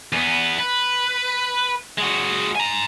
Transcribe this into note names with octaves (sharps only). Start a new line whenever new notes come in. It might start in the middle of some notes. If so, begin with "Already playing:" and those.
E2 B3
B4
G#3 F#4
G#5 A#5